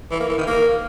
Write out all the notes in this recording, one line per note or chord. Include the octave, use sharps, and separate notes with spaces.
E3
A#3
E3
D#3
A#3